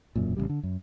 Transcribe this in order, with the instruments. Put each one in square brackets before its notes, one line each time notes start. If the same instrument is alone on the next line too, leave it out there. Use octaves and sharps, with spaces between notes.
[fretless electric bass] E1 F#2 A#2
A1 F2 C#3 G3
D3
F#2